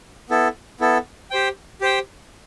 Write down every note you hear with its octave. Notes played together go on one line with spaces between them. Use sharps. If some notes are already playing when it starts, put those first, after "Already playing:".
B3 E4 A4
B3 E4 A4
G4 C5 G5
G4 C5 G5